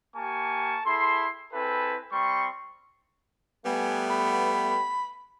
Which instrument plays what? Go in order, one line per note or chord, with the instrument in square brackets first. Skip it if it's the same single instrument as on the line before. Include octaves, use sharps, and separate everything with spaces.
[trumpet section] A#3 G4 G#5 A5 C#6
E4 G#4 A4 C6
C4 E4 G#4 A4 B4
G3 C4 C6 C#6
[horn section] G3 A3 B3 [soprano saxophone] G#5
[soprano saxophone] B5